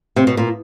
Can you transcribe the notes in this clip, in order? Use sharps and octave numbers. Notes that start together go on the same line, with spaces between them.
C3
B2
A#2